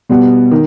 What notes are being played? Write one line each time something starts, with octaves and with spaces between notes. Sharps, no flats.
B2 G3 B3
D#3